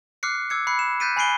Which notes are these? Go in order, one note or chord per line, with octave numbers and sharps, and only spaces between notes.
D6 F6 F#6 C7 C#7
D6 E6 G#6 C#7
B5 F#6 C7 C#7
E7
F#6 G6 A6 B6 D7 D#7
G#5 B5 F#6 C7 D7 G7